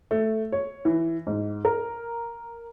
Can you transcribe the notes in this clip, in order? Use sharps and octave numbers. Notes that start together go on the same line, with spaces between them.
A3
C#5
E3
G#2
A#4